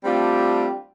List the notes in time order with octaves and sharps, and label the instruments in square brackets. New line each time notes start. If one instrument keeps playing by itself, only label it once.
[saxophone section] G3 A3 C4 D4 F4 G4